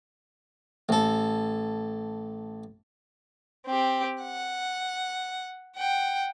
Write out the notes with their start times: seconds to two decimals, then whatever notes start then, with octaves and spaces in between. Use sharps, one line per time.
0.89 A1 A4
3.67 C4 G4
4.23 F#5
5.76 F#5 G5